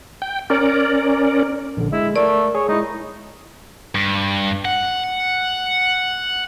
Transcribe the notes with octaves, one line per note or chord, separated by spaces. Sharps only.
G5
C#4 A#4 D5
A#1 D3
G#3 E4
A3 A#4 D5
G#4 C#5
G#3 D#4 E4
G2
F#5